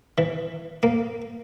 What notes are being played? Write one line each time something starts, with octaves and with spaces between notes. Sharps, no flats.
E3
A#3